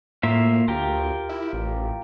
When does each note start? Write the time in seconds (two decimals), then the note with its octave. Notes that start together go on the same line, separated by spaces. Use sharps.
0.23 A2 A#3 F4 E5
0.68 D2 F4 G4 A#4
1.29 E4
1.53 A1